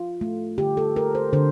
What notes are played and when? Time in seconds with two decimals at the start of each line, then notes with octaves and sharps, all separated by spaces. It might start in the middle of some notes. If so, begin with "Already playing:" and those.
Already playing: F4
0.21 A3
0.58 D3 G4
0.77 A4
0.96 A3 A#4
1.15 C5
1.33 D3 C5